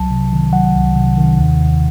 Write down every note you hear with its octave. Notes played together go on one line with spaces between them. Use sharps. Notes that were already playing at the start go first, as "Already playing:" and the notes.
Already playing: C2 F#3 A5
C3
D#3
F#3 F#5
C2
C3
D#3
D#2
D#2